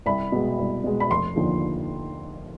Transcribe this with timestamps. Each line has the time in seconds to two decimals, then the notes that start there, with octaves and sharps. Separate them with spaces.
0.06 C2 B5
0.32 B2 G#3
0.59 C2
0.84 B2 G#3
1.00 B5
1.10 F1 C6
1.36 D#2 D3 F3